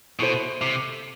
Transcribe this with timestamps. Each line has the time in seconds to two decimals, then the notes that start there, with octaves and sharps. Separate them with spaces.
0.20 B2 E4 A4 C5
0.62 C3